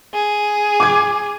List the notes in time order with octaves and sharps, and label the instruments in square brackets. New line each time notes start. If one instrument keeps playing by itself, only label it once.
[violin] G#4
[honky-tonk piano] D6 G#6